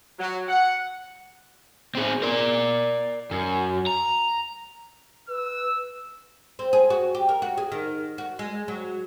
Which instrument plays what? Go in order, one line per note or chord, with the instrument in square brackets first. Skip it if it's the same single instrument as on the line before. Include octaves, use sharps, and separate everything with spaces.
[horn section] F#3
F#5
[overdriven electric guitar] C4 G#4
A#4 D5
F#2
A#5
[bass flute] B4 [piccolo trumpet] E6
[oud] C4
G#4
F#4
G4
A#4
F#4
G#4
D#3
F#4
G#3
F#3